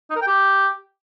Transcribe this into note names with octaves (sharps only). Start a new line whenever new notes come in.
D#4
A#4
G5
G4